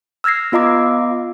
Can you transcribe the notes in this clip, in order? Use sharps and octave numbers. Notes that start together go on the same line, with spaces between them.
E6 F6 G#6 A#6 C7
B3 F4 D#5 A#5 D6